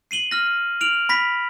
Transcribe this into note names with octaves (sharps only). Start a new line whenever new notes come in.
C7 D#7 F#7 G7
F6 A#6
F6 D7 F7 F#7
B5 A#6 B6